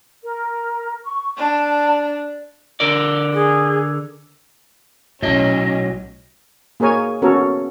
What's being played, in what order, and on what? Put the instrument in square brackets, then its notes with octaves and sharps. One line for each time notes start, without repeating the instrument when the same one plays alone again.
[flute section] A#4
C#6
[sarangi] D4 [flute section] A5
[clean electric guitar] D3 A#4 D5
[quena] G#4
[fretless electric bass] B1 A2 [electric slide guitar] F#3 D#5 [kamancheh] C#4
[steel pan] A#3 G#4 A#4 C#5 G#5
B3 C#4 F#4 A4 A#4 C#5